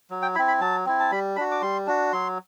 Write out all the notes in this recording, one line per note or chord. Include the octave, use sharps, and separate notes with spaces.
F#3
G5
C4 E4 B5
B5
F#3 A5
C4 E4
A5
G3 B5
D4 F#4 B5
D6
G3 C6
D4 F#4
F#3 C6